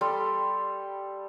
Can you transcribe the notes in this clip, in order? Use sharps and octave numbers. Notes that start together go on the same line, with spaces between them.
G3 A4 C6